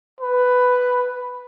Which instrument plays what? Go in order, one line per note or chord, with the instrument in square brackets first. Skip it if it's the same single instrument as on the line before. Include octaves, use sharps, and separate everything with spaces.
[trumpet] B4